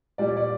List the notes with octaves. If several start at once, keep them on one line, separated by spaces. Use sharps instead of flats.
A#2 G3 D5
C#5
D5